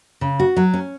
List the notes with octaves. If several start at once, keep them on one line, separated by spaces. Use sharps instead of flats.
C#3
F#4
F#3
C#4